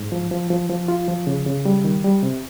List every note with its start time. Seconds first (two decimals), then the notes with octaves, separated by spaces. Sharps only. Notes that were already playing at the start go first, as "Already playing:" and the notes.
Already playing: G#2
0.12 F3
0.31 F3
0.50 F3
0.69 F3
0.88 F4
1.08 F3
1.27 C#3
1.46 C#3
1.65 G3
1.84 D#3
2.04 G3
2.23 C3